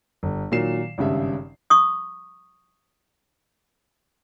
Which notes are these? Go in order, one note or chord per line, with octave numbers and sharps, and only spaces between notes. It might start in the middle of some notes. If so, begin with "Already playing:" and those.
G1
A#2 D#3 F#3 C7 E7
G#1 G2 C#3 E5
C#6 D#6